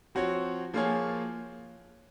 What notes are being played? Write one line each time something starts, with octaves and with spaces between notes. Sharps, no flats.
F3 C4 F#4 C#5
F3 A#3 F4 G#4 C#5